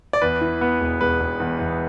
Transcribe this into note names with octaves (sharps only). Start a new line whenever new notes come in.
D5
E2 B4
E3
B3
E1
E1 B4
E1
E2
E2